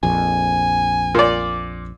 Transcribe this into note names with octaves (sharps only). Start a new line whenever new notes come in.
A#1 F2 G#5
A#2 D5